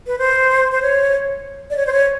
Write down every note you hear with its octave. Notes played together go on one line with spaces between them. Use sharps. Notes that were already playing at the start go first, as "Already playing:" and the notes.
B4
C5
C5
C#5
D5
C#5
C5
C#5